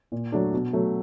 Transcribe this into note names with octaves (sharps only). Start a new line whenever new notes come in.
A#2
F#3 A3 D4
B2
F#3 A3